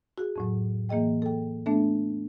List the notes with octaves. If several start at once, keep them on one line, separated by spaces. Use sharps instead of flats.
F#4 G#4
F2 A2 F#3
E3 A#3 G#4 D#5 G5
A4 G5
A3 B3 D4 A4 E5